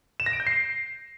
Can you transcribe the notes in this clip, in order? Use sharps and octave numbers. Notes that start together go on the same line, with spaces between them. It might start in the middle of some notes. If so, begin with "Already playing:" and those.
E7
A#6
D7
G6
C7